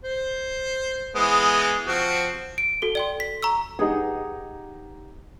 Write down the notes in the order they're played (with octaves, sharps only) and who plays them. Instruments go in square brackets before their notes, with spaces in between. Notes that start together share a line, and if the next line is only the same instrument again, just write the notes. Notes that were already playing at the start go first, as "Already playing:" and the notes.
[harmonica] C5
E3 G#3 B3
F3 C4 F#4
[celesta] D7
F#4 A4 G7
[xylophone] D5 G5 C6
B6
A#5 C#6 E6
[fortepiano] D#4 G#4 [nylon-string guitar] G4 B4 F#5